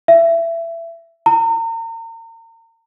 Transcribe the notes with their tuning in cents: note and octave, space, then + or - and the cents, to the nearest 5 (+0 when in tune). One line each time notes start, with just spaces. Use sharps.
E5 +20
A#5 -40